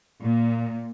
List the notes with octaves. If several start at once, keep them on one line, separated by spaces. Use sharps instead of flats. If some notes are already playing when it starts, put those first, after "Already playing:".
A#2